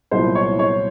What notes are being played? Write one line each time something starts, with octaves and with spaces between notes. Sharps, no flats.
C2 A#2 F#3 B3 E4 C5
C#5
C#5